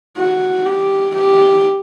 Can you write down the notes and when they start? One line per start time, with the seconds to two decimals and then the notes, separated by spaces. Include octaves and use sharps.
0.18 F#4
0.66 G4
1.14 G4